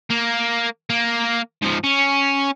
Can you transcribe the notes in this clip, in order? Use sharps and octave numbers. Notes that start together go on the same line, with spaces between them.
A#3
A#3
G#2 F3
C#4